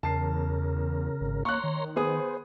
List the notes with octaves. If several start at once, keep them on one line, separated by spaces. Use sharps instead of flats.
E2 C#3 A#4 A5 C7
G#1
A#3 C#5 A#5 C6 C#6 F#6
D#3
B3 G#4 C5 D#6